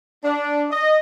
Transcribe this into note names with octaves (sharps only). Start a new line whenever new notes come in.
D4
D#5